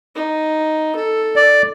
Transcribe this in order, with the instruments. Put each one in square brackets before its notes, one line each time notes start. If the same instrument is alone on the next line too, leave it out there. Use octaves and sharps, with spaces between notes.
[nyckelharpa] D#4
A4
[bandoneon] D5